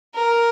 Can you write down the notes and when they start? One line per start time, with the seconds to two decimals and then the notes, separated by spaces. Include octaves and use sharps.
0.15 A#4